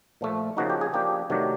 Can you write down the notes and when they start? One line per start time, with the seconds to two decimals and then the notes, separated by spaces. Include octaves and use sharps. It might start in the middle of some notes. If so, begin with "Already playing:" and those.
0.21 A#2 F3 A3
0.57 C#3 F3 A#3 D#4 F#4
0.70 G4
0.81 G#4
0.93 F3 A#3 D4 G4
1.30 C3 D#3 F#3 A3 D4